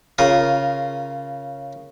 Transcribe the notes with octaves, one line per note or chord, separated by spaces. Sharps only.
C#3 F4 A#4 D#6